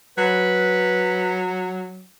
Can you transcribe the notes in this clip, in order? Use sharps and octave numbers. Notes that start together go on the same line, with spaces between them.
F#3 B4